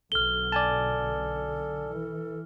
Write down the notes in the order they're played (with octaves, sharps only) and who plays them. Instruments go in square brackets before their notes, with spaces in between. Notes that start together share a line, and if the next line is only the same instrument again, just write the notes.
[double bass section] B1 D3 [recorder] A4 [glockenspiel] F6 G7
[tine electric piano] D5 G#5 A5
[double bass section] E3